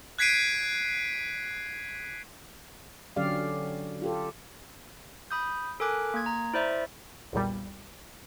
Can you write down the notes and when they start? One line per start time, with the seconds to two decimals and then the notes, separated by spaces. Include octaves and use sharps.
0.19 F#6 G#6 B6 C7 D7 D#7
3.16 D3 F#3 C#4 G4 D5 F5
4.02 F4 G4 A4
5.31 B5 D#6 G6
5.80 A4 A#4 G#5 D6 F#6
6.14 A#3 G#6
6.26 A#5
6.54 E4 C5 D5 E5
7.33 B1 E2 A#2 G3